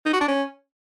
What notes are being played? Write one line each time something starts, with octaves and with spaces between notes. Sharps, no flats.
D#4
F#4
D4
C#4